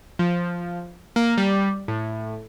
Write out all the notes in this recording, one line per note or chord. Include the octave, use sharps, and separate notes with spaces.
F3
A#3
G3
A2